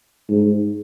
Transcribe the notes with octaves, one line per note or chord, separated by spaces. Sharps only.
G#2